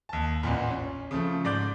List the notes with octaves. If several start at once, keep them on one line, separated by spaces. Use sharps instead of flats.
D#2 A5
A1 E2 A#2
C#4
C#3 F3 A3
G#2 D5 D6 G6